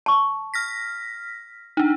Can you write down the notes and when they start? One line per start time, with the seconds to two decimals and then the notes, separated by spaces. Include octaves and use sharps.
0.06 A5 C#6
0.54 F6 A#6 B6
1.77 D4 D#4